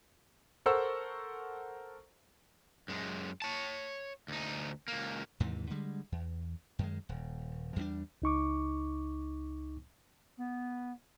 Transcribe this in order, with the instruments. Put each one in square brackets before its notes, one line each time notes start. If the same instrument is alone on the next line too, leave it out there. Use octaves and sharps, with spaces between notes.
[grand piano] A4 A#4 C5 F#5 C#6 E6
[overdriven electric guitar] F#2 G#3
C#5 A5
D2 D#4
C#2 A#3
[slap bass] D#2 G#2 C3 E3
D3 G3 G#3
E2
F#2 D#3 G#3
D#1
E2 G3 C4 D4
[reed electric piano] C#2 D#4 C#6 D6
[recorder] B3